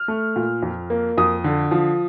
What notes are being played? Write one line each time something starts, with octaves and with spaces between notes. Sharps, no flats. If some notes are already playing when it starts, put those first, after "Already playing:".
Already playing: F6
A3
A#2
F2
A#3
F2 D#6
D3
F3